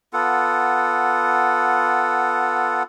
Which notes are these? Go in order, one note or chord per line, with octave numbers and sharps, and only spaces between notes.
B3 F4 A4 F#5